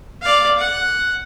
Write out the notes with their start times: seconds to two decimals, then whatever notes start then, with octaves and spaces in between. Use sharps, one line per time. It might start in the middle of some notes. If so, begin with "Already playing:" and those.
0.22 D5 F5
0.59 F#5